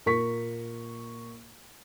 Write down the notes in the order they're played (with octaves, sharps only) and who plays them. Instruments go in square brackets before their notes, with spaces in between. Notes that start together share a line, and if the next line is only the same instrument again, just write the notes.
[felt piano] A#2 A#4 C#6 B6